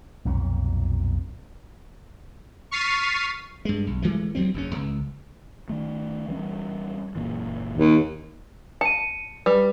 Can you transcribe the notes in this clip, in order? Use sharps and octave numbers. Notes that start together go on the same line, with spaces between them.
B1 F2 A#2 C#4
C#6 F6 A6 B6 C7 D#7
G2 G#3
B1
E3 G#3 A3
D2 F#3 G3 C4
F#1 E2 C#4
C#2
D#3 A3
E3 G3 C#4
F#1 A#2 E3
D#2
A5 C#7 D#7
G3 B4